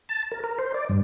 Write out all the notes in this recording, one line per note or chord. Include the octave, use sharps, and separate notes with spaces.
A5
A#4
A#4
C5
D5
G2